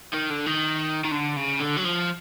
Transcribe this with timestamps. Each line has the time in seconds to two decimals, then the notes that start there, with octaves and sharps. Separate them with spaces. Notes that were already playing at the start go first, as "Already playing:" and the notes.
0.14 D#3
0.31 D3
0.46 D#3
1.04 D#3
1.11 D3
1.37 C#3
1.61 D3
1.77 F#3
1.85 F3